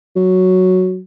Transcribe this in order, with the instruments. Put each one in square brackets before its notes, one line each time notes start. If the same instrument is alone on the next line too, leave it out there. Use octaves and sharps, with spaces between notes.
[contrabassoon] F#3